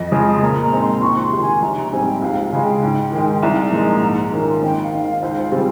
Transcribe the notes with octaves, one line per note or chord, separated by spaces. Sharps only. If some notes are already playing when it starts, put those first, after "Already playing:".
Already playing: F2 D#5
C#3 F3 G#3
A#2 A#5
A#5
G#3 C4 D#4
C6
C#2 C#6
C6
C3 D#3
G#5
A#1 A#5
A#5
G#2 G3 C4 G#5
G5
C#2 F5
F5
C#3 G#3
G5
G#2
D#3 G#3
C2 A#5
A#2 F3 G#3 D#4
G#2
D#3 A#3 C#4 F4
G#1 G5
F5
G#2 D#3
F5
C#2 C5
F5
C#3 G3 C4 F4